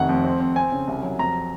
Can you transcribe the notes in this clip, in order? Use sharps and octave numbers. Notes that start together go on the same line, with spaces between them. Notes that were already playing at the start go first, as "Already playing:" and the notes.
Already playing: F1 D#3 F#5
F2
C4
C4
C4 G#5
C#3
C2
F#3
F2 A#5